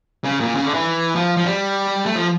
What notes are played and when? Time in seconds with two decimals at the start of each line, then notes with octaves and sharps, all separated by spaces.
0.24 C#3
0.40 A#2
0.55 C#3
0.65 D3
0.74 E3
1.15 F3
1.37 F3
1.46 G3
2.06 A3
2.15 F3